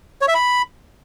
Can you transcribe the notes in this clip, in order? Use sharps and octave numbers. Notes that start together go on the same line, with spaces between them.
C#5
E5
B5